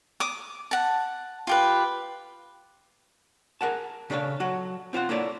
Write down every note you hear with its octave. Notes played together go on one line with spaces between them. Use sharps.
D6 D#6
F#5 A5
F4 G4 B4
G#4 A#4 F#5 A5
C#3 D4 G#4 A4 C#5 F5
F#3 F#4 A4
C4 F4 C5 F#5
A#3 E4 A4 C#5 D5